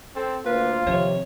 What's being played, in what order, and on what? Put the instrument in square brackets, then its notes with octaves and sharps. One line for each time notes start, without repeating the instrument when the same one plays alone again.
[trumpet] C4 [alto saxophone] A4
[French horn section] D2 A#3 C5 [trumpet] F4 [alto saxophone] B4
[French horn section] D#2 C3 [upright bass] D#3 F3 [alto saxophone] C#5